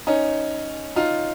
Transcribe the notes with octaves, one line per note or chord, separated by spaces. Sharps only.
C#4 D#4
D#4 F4